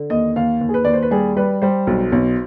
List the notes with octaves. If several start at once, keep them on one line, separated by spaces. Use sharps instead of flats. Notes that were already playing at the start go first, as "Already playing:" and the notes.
Already playing: D3
D#2 D#5
D#2 F5
D#2
G#4
B4
D#2 D5
C5
B4
G3 G#4
G3 B4
G3 C5
B1
B1